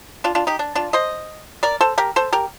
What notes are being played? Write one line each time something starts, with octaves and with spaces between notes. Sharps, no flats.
D4 F4
D4 F4
D#4 G4
D4
D4 F4
C5 D#5
A#4 D5
A4 C5
G4 A#4
A4 C5
G4 A#4